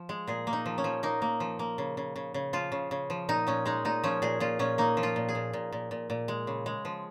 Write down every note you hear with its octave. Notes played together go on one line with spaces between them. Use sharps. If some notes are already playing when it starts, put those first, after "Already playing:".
Already playing: F3
G#3
A#2 G#4
A#3
D#4
F3
C#4
F3
A#3 D#4
A#3
F3
A#3
C#3
C#3
C#3
C#3
F3 F4
C#3
C#3
F3
A#2 D#4
A#2 C#4
G#3 D#4
A#2 D#4
F3 C#4
A#2 G#4
A#2 F4
A#2 C#4
A#3 D#4
F3
F4
A#2
G#4
A#2
A#2
A#2
A#2
A#2
G#3
C#3
G#3
F3